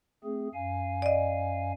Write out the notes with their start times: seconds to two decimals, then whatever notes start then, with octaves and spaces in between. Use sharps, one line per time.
0.24 A3 C4 G#4
0.54 F#2 F5 G#5
1.02 D5 D#5